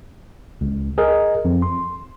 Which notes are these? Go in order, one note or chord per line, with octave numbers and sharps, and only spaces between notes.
C#2
G#4 A#4 D#5
F2
C6